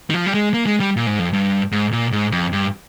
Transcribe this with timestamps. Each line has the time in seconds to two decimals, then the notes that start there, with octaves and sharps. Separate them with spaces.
0.10 D#3
0.14 F3
0.26 G3
0.34 G#3
0.54 A#3
0.67 G#3
0.80 G3
0.96 A#2
1.07 G#2
1.19 F2
1.33 G2
1.72 G#2
1.92 A#2
2.12 G#2
2.32 F2
2.52 G2